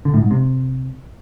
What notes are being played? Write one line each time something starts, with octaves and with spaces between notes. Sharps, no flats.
D3
A2
G#2
C3